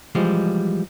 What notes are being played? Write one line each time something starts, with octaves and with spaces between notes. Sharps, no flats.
E3 F3 G3 G#3